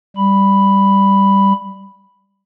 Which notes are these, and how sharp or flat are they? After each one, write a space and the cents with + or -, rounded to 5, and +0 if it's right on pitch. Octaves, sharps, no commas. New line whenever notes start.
G3 +0 B5 +0